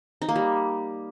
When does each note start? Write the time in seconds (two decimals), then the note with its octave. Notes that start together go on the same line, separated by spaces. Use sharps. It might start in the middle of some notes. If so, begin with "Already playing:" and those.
0.22 D#4
0.29 A#3
0.36 G3